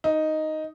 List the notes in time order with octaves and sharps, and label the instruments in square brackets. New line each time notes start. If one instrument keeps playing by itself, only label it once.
[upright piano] D#4